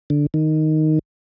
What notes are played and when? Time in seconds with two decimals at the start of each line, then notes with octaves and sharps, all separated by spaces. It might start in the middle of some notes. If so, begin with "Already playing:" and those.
0.10 D3
0.34 D#3